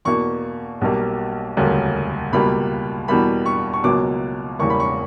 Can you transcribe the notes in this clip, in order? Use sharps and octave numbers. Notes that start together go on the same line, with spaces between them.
E2 B2 A#3 C#6
B1 B2 G3 A#3
E1 D2 C#3 G3 A#3
C#2 B2 G3 A#3 B5
E2 B2 G3 A#3 B5
C#6
C#6
C#2 B2 F#3 A#3 D6
E1 E2 C#3 G3 A#3 C#6
B5
C#6